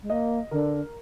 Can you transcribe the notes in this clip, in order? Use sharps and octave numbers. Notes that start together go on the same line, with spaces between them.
G#3
A#3 D#5
D3 A#4